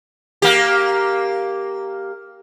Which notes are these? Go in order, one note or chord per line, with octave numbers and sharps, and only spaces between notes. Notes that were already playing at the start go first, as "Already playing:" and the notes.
A#3 G4